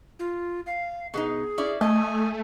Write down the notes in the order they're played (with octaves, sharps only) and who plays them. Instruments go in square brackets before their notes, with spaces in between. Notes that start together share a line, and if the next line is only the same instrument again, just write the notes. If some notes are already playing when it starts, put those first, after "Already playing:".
[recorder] F4
F5
[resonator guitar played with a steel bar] B2 B3 D#4 [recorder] G#4
[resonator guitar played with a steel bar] C#4 E4 D5
[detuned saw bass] A3 [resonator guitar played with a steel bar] D#5 [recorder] G#5